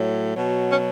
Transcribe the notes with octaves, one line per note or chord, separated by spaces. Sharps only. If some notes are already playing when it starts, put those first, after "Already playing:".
Already playing: A2 F#3
B2 F#3
C#4